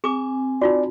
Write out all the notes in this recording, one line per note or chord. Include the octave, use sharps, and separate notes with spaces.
C4 G#4 G#5 D6
D#4 F4 F#4 D5